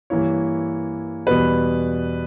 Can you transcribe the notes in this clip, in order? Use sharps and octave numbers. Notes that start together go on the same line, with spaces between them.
G2 E3 A#3 E4 C#5
E2 B2 G3 B4